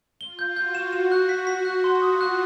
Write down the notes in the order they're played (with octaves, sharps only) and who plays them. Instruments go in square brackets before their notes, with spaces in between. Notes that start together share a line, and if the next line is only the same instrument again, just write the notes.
[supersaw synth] F4 [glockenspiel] G7
[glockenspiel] G6
[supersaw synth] F#4 [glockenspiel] G6
[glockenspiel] E7
E7
F#6
B6
B6
F#6
C6
[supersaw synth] F4 [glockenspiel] D#6
[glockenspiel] F#6